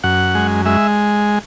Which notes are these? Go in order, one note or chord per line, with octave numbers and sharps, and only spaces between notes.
F#2 F#5
G#3
G#3 E5